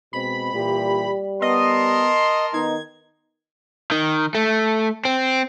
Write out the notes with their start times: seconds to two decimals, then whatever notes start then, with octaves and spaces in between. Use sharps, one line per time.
0.13 B2 G#3 C4 B5
0.54 A#2 E3 G3 G4
1.42 B3 A#4 D#5 A5 C6
2.54 D#3 B3 D#4 G#6
3.92 D#3
4.35 A3
5.05 C4